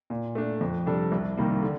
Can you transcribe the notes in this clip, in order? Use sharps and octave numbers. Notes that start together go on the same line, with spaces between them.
A#2
A3 D4
F2
C3 G3 D4 A4
C2
C3 D#3 G3 A#3
D3